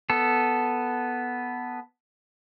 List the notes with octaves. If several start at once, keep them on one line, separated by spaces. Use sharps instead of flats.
B3 A4